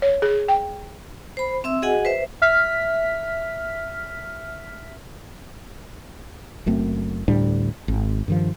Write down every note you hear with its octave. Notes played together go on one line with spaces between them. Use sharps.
C#5
G#4
G5
C5 B5
C4 E5 E6
F#4 G#4 D#5 F#5 G#5
B4 C5 E5
E5 F6 B6
F#1 F#2 A3 C4
D2 A2 G3 D4
G#1
G2 D#3 F3